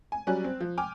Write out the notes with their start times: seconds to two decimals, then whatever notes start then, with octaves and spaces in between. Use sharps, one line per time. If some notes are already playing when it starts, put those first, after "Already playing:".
0.12 G#5
0.27 F#3 G3 C#4 D5 G#5 F#6
0.44 C4
0.61 F3
0.78 G5 G#5 D6 F6